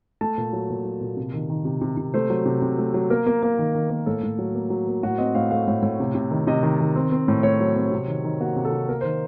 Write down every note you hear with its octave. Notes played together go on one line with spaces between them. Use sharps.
A3 A5
A#2
F#3
A#2
F#3
A#2
C3
D#3
D#3
C3
C3
C3
A3 C5
F#3
C3
C3
A3
F#3
A#3 A#4
A#3
A#3
D#3
D#3
A#3
A2 A4
A2
F#3
A#3
F#3
A#3
A2 F#4
C4 D#5
A2 F5
A3 F5
A2
A2
C3
C3
D#3
C3 D#5
D#3
D#3
C4
C4
A2
A3 C#5
F#3
C4
C3
D#3
D#3
A#3 F#4
C3
A4
C3
A#3 A#4
D#3 C5